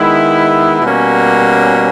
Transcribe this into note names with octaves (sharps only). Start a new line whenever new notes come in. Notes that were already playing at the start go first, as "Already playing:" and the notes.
Already playing: D#3 G#3 B3 E4
B2 G3 A#3 C#4